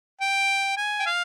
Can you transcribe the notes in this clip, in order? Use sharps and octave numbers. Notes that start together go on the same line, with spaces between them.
G5
G#5
G5
F5